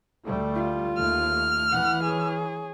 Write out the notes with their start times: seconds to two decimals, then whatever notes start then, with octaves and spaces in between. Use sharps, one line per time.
0.25 D2 G3 A3
0.55 F4
0.98 D#2 A3 F6
1.72 E3 F#5
2.04 G#4 C#5